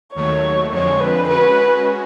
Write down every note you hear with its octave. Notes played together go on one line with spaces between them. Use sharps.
D#2 D#3 F#3 A3 C#5
F2 D3 F3 G#3 C4 C#5
B4
G#3 C#4 F#4 B4